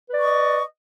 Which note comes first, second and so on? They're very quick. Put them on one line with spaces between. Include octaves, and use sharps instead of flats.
B4 D5 C#6 D#5